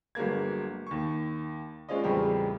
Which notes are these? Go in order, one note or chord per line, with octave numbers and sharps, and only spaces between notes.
G1 F#3 G#3 A#3 G#6
D#2 C#6
G#3 C#4 D4 F4 D#5
E2 A2 C#3 F3 G3 C4